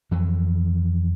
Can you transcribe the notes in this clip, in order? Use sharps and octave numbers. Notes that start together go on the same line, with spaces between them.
F2 E3 F#3